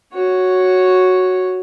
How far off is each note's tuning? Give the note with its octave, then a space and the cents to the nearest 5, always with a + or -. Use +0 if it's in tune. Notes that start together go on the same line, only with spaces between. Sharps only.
F#4 +0 C#5 +0